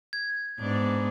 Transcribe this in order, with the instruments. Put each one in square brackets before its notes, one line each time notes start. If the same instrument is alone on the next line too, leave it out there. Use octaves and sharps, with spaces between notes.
[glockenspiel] G#6
[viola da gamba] G#2 B3 D4